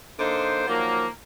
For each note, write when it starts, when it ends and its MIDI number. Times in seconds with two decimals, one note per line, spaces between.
0.19 0.64 50
0.19 0.64 58
0.19 0.64 63
0.19 0.64 72
0.67 1.07 51
0.67 1.07 53
0.67 1.07 54
0.67 1.07 58